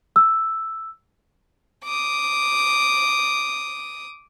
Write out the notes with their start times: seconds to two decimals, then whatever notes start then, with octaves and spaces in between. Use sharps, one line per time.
0.16 E6
1.85 D6 D#6